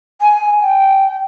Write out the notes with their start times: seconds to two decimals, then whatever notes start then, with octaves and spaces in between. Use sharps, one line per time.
0.22 G#5
0.61 G5